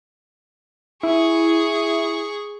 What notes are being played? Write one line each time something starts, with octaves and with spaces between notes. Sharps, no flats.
E4 G#4 C#6